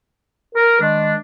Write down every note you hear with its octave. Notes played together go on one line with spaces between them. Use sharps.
A#4
D#3 G#3 D4